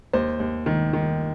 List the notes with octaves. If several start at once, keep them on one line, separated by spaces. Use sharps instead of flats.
D#2 C5
D#2
D#3
D#3